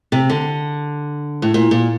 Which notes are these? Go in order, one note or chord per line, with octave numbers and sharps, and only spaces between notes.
C3
D3
A2
A#2
A#2